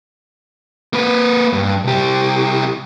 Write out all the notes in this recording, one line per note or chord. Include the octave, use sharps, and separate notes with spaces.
A#3 B4
G2
C2 G4